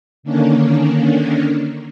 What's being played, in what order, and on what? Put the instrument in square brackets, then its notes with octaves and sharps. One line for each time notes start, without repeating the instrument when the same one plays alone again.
[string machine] D3 D#3 A#3 C#4 D4